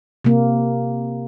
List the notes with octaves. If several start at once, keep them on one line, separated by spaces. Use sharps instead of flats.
C3 A#3